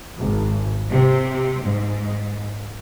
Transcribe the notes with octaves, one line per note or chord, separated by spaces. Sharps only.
G#1
C3
G#2